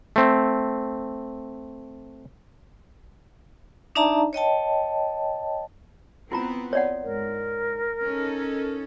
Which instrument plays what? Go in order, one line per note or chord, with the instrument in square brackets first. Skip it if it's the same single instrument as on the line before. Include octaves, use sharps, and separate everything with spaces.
[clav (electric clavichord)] A3 C4
[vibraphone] D4 D#4 D5 E5 A5 A#5
C#5 D#5 G5 A5
[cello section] B3 C4 [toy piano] E4 F4 A#5
[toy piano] C#5 D5 F#5
[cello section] G#2 [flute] A#4
[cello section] C#4 D#4 A4